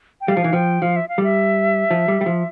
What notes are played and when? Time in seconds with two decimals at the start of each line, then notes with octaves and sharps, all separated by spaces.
0.21 G5
0.28 G3 F5
0.37 F3
0.44 E3
0.53 F3 G5
0.82 F3 F5
0.96 E5
1.09 F5
1.18 G3
1.23 E5
1.91 F3
2.08 G3
2.21 G3
2.26 F3